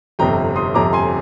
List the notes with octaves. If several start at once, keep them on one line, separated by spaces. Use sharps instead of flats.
G1 F2 C3 G5 A#5
C6 D#6
G1 F2 C3 A#5 D6
G#5 C6